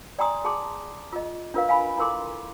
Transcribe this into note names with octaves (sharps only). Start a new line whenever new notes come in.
D5 G5 G#5 A#5 C6 D#6
G#4 A5 C6 D6
F4 D#5
D4 F4 A#4 B4 F5
F5 G#5 B5
E4 A4 A#4 C6 D6